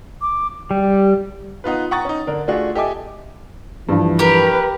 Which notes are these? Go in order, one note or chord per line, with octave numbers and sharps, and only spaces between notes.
D6
G3 G4
B3 D#4 F4 B4
F#5 G5 A#5 C#6 D#6 A6
C#4 D#4
D3 D4 A#4
A3 D4 F4 F#4 G#4
G4 A4 D#5 E5 G#5 D6
G2 E3 F3
G4 A#4 B4